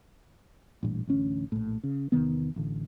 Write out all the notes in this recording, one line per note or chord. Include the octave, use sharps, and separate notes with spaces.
A1 G2 A#2
A1 D2 C#4
A#1 A2
C#3
E2 C3 D#3 B3
A1 D3